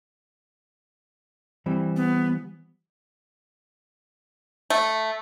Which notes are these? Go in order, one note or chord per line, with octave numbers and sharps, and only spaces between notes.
E3 G3 C4
B3
A3